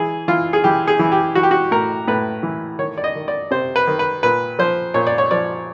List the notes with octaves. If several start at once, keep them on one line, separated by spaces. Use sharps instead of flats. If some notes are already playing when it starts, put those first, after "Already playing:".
Already playing: E3 G#4
E3 F4
G#4
E3 G4
G#4
E3
G4
E3 F#4
G4
F#4
A2 A#4
A2 B4
E3
D#3 C#5
D5
D#5
D#3
D5
C3 C5
B4
D#3
B4
A#2 B4
F3 C5
A#2 C#5
D5
C#5
F3 D5